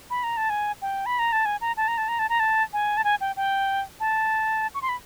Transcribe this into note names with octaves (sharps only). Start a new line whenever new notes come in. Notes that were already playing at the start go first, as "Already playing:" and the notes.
B5
A#5
A5
G#5
G5
B5
A#5
A5
G#5
A#5
A5
A#5
A5
A#5
A5
A#5
A5
G#5
A5
G#5
G5
G5
A5
C#6
C6
B5